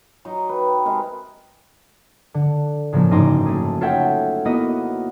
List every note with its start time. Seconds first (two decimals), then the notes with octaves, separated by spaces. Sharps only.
0.25 F#3 D#4 D#5 A#5
0.49 B4 G5
0.85 C3 G#3 G#4 A#4
2.34 D3
2.93 A2 C#3 F3 A#3
3.11 F#1 G#2 D#4 A#5 C6 D6
3.46 A3 G#4
3.81 F4 A4 C#5 E5 F#5 G5
4.45 A#3 B3 E4 F#4 D#5